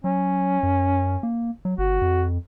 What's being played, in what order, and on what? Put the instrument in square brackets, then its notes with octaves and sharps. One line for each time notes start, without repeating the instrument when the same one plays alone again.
[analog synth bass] F#3 [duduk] C#4
[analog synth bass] F#2
A#3
F#3
[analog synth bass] G1 [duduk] F#4
[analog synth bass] F2